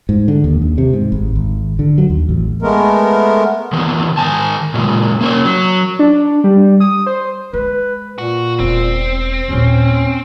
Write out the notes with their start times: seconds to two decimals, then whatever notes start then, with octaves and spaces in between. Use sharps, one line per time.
0.09 G#2
0.28 D3
0.44 D#2
0.62 D#2
0.78 C3
0.93 G#2
1.12 G#1
1.35 G#1
1.79 D3
1.98 F#3
2.10 D#2
2.29 A1
2.62 G#3 A3 B3 A#4
3.73 D#3 E3 B3
4.17 D#3 G#5 A5
4.74 A#2 C#3 G3 G#3
5.21 A#3 C#4 A#4 C#5
5.45 F#3
5.99 D4
6.44 G3
6.80 D#6
7.06 C5
7.53 G#3 B4
8.18 A#2 F#4
8.60 E1 C4
9.48 D#2 A#2 C#4